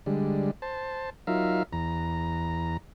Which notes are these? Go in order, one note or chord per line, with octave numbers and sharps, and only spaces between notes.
D3 G3 G#3
C5 A5
F#3 D#4 F4 A#4 E5 F5
E2 A#5